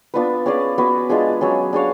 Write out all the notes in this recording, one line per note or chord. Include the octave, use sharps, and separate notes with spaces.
B3 D4 F4 B4
C#4 G#4 D5 F5
B3 F#4 B4
G#3 D4 F4 G#4
F#3 C#4 G#4
D4 G#4 C#5 F5